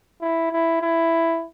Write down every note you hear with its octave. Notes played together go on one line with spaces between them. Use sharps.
E4
E4
E4